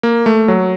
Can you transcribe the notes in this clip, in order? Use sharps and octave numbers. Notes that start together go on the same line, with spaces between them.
A#3
A3
F#3